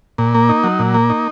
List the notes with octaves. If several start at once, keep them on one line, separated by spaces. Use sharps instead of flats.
A#2
A#3
D#4
F#3
A#2
A#3
D#4